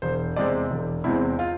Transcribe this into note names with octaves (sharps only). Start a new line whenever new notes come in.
E1 C5
E2 C3 G#3 C4 D5
E1
E2 C3 G#3 C4 E4
F4